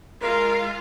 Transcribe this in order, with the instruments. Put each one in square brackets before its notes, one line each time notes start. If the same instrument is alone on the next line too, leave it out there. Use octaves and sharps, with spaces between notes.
[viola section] G#3 F4 F5 [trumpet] A#4